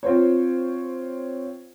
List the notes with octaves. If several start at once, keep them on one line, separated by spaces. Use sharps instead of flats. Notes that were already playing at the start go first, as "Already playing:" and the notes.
C4 F4 C5 C#5